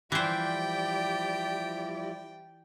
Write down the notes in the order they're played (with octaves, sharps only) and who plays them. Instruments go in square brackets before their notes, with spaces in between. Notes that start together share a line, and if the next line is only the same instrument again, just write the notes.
[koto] E3 C5 [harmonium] F3 G3 E4 [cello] G4 D5 [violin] G5